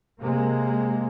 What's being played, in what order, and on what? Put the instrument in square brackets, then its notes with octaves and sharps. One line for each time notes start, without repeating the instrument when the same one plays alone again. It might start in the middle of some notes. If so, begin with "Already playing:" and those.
[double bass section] C3 G#3 A#3